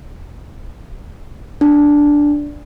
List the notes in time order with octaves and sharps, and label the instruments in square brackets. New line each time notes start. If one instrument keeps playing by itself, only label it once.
[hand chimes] D4